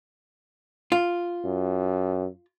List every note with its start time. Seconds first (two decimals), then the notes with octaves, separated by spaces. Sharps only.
0.92 F4
1.44 F#2